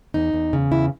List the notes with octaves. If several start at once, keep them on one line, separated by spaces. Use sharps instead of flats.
E2 D#4
E2
C#3
E2 E4